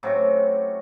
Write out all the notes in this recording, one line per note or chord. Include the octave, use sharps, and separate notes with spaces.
A2 C3 F#3 C#4